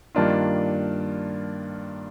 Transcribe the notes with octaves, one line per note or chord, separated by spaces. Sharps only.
G2 D#3 A#3 D4 F4